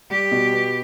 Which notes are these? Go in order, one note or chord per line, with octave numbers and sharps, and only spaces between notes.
G3 G4
B2
B3